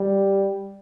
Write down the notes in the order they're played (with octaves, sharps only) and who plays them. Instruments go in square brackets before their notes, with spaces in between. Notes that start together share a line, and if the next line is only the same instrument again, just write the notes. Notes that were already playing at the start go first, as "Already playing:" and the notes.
Already playing: [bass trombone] G3